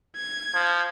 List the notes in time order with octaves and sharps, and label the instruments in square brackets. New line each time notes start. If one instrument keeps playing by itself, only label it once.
[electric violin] G#6
[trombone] F3